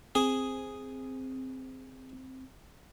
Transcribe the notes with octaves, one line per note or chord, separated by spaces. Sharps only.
C4 G#4